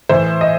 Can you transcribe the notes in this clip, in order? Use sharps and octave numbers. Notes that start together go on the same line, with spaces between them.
A2 E3 C5
D#5